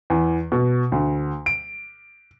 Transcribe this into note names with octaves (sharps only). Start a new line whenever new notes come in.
E2
B2
D2
D7